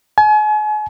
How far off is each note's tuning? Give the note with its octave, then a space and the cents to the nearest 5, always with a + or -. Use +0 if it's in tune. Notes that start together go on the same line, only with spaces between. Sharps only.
G#5 +40